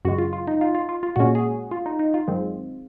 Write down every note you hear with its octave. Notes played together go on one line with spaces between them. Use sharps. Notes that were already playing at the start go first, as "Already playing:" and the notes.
F#2 C#3 G#3 F#4
F4
F4
D#4
F4
F4
F4
F4
A#2 G#3 C#4 F#4
G#4
F4
D#4
D#4
F4
F#2 D#3 G#3 C4